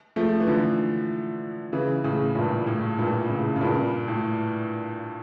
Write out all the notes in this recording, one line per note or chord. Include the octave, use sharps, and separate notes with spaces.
F3 A3
E3
D3 F3
C#3 E3
A2 C#3
G2 A#2
A2
G2 A#2
A2 C#3
C#3
G2 A#2
A2